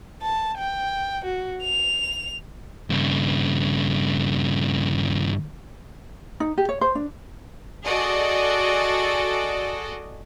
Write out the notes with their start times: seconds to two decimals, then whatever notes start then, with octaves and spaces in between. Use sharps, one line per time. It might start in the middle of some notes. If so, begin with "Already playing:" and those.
0.22 A5
0.58 G5
1.24 F#4
1.63 F7
2.90 G2 C#3
6.40 D#4
6.58 G4
6.69 C#5
6.81 C5
6.95 D4
7.85 F#4 G#4 A4 D5 D#5